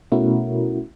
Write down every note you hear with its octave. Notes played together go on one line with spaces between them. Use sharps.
B2 A3 C#4 E4 F#4 A#4